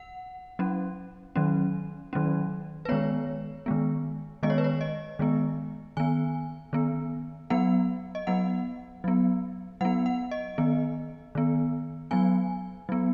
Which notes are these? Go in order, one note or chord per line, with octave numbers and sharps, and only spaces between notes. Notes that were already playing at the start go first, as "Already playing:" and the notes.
Already playing: F#5
F#3 C#4
D#3 F#3 C#4
D#3 F#3 C#4
B4
D#3 G#3 B3 C#5
D#3 G#3 B3
D#3 G#3 B3 D#5
C#5
B4
C#5
D#5
D#3 G#3 B3
D#3 B3 G#5
D#3 B3
F#3 B3 F#5
D#5
F#3 B3 F#5
F#3 B3
F#3 B3 F#5
F#5
D#5
D#3 B3
D#3 B3
F#3 B3 G#5
F#3 B3